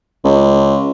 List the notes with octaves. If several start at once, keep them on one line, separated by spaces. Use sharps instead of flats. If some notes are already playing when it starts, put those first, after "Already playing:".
C#2